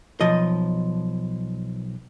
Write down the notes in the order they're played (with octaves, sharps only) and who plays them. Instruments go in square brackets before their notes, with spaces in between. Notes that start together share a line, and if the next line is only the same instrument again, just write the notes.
[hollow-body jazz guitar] B1 F3 D#5